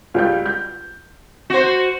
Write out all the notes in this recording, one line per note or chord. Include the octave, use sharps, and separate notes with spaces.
C#2 G3 G6
G6
F#4 C5